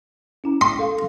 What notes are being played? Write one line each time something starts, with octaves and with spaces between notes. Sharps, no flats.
C#4 E4 A#5
C6
A4 F5